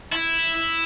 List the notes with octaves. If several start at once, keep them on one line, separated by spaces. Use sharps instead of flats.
E4